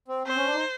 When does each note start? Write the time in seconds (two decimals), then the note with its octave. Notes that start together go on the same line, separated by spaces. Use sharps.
0.08 C4
0.27 C4 C5
0.36 C#4
0.46 D4
0.54 D#4